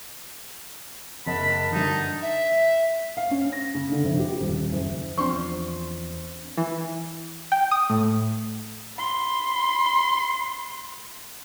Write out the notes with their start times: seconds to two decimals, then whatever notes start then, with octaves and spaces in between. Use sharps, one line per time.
1.26 F#1 A#4 D#5 F#5 A5 B5
1.72 G2 D3 D#4
2.22 E5
3.17 F5
3.31 C#4
3.52 A#6
3.75 C#3
3.92 D3
4.04 F1
4.19 G4
4.40 D#1
4.72 F#1
5.18 E2 F3 C4 D4 C5 C6 C#6
6.57 E3
7.52 G5
7.71 D#6
7.90 A2
8.98 B5 C6